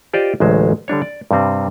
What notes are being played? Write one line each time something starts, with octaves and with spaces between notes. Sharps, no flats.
F4 G4 C5 D5 D#5
A1 D2 F#3 G#3 C5
D3 G3 D4 C#5
D5
G2 C3 G3 C4